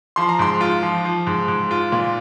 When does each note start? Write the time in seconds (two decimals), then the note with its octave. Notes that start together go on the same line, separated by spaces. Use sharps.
0.16 F3 C6
0.29 A#5
0.39 G#2 C6
0.61 F4
0.83 F3
1.05 F3
1.27 G#2
1.48 G#2
1.71 F4
1.92 A#2